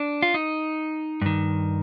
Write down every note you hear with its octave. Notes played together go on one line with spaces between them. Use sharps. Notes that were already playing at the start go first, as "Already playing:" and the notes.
Already playing: D4
F4
D#4
G2 D#3